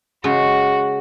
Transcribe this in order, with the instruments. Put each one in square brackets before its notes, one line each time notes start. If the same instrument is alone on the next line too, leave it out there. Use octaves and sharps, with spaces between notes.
[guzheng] C#3 G#3 [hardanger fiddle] F#4